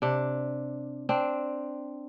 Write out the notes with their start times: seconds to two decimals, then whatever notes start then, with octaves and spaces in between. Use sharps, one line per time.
0.02 C3 D4
1.09 C4 D4